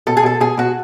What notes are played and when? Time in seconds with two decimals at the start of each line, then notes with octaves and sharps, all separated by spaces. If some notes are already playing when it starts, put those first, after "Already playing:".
0.07 B2 A4
0.17 G#4
0.24 B2 A4
0.41 B2 G#4
0.58 B2 F#4